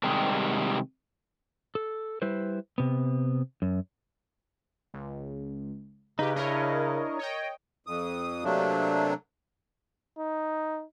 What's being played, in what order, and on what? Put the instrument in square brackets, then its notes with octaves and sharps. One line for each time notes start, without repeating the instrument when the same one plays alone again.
[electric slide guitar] C3 D#3 G3 G#3
A4
G3 E4 B4 C5
C3 B3
F#2
[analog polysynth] C#2
[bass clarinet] C#3 [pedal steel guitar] D#4 [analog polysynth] G4 B4
[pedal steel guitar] D4 E4 [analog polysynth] A#4 C#5 D#5
[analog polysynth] C#5 D#5 G5
[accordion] F2 D#6
C3 F#3 A3 A#3 D4
[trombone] D#4